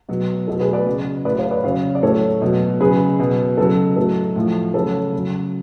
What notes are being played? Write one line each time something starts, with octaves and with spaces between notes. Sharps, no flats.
B2 F#3
B2 F#3 A4
G#4 B4
B4 D5
C#3 F#3
A2 F#3 B4 D5
C#5 F5
B4 D5
C#3 F#3 C#5 F5
D5
A2 F#3 A4 C#5
B2 F#3
C#3 F#3 G#4 B4
B2 F#3
C#3 F#3 A4
A2 F#3 A4
A2 F3
C#3 F#3 A4 C#5
C#3 F#3